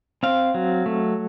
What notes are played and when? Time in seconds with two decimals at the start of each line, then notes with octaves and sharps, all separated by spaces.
0.23 C4 F5
0.54 F#3
0.86 A3